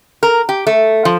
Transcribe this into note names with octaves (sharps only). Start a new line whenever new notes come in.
A#4
G4
A3
F3